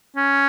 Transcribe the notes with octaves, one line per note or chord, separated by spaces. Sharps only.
C#4